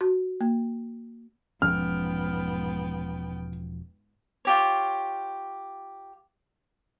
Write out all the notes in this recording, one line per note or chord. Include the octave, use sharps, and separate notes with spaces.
F#4
A#3
E1 G#2 F3 B3 C#4 G5 F6
F4 G4 C#5